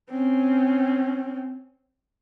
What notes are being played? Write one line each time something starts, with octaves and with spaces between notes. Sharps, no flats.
C4 C#4